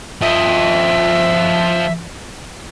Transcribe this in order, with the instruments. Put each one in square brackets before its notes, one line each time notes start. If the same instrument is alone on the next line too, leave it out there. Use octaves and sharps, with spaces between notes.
[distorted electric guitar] F3 D#5 [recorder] E5